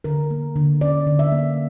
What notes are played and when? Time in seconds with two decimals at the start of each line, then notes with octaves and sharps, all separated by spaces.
0.04 D3 A#4
0.30 A#3
0.56 D3
0.81 C#4 D5
1.07 D3
1.19 E5
1.32 A#3